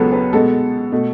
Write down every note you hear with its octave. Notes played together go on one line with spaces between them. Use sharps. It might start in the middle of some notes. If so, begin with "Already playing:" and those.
Already playing: C#2 C#3 F#3 B3 A4 B4
B4
B2 G#3 B3 A4
B2 A3